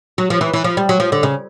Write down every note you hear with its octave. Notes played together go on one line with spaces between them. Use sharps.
F#3
F3
E3
E3
F3
G3
F#3
F3
D3
C#3